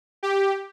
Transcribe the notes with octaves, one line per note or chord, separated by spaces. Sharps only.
G4